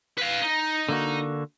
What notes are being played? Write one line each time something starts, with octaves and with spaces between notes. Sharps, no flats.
B4 F5
D#4
D3 A#3 F#4